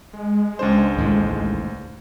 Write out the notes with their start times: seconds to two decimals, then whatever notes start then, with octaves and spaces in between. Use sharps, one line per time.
0.13 G#3
0.59 C#2 D4 C5
0.97 A1 D#2 A2